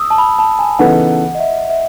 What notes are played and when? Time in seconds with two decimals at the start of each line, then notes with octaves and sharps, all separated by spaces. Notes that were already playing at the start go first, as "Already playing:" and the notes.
Already playing: D#6 E6
0.11 A5
0.18 B5
0.39 A5
0.59 G#5
0.79 C#3 E3 B3 D#4 A4 F#5
1.35 D#5
1.39 E5
1.65 F#5
1.70 E5